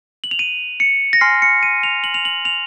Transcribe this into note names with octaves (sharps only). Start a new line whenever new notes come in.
F#7
F7
D#7
C#7
A#6
G#5 C6 F6 C7
C#7
D#7
F7
F#7
F7
F#7
F7